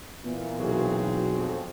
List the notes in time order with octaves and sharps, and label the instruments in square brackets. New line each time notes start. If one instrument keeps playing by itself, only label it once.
[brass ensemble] A#2 E3 [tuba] B3
[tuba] B1 [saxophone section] C4 F#4 G#4
[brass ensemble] F2